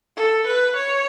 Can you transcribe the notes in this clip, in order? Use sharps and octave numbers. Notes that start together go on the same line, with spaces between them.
A4
B4
C#5